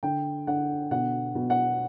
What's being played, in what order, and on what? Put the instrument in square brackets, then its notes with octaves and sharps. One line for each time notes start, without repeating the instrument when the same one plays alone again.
[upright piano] D3 G5
D3 F#5
B2 F#5
B2
F#5